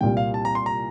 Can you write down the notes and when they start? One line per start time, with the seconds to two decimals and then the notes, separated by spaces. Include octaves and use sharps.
0.01 C2 A#2 G3 G5
0.17 F5
0.34 A5
0.45 A#5
0.55 C6
0.66 A#5